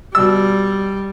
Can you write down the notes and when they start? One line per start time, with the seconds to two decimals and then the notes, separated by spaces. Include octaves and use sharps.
0.15 B2 G3 E6